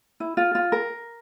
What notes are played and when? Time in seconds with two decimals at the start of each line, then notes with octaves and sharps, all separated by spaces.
0.20 E4
0.37 F4
0.55 F4
0.72 A#4